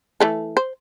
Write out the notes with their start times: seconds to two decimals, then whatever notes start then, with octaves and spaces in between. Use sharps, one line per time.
0.20 E3 A3 A4
0.57 C5